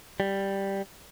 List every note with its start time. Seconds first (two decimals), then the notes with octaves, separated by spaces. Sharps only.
0.20 G3